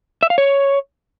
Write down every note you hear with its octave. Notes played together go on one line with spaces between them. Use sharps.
E5
F5
C#5